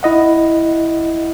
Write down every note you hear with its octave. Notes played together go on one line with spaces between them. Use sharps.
E4 D#5 F#5